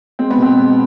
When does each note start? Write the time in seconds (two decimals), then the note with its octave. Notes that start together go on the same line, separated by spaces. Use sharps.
0.19 G#3 C4
0.30 B3
0.38 B2 C4
0.57 G#3